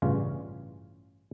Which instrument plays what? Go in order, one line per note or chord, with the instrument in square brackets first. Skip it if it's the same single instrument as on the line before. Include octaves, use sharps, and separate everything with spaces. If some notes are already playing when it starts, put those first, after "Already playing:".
[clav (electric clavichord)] A1 G2 C#3 E3 C#4 F4